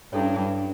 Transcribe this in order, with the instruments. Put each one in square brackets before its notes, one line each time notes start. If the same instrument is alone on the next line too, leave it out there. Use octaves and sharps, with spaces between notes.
[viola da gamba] G2 [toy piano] C#4 E4 A4 C#5